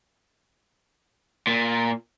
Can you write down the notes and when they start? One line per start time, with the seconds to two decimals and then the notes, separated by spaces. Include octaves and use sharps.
1.47 A#2